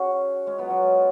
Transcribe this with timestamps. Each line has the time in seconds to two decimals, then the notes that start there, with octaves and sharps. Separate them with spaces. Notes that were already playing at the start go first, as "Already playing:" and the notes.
Already playing: C#4 F#4 G#4
0.47 G#3 C#4
0.58 F#3 B3
0.70 F#3
0.82 G#3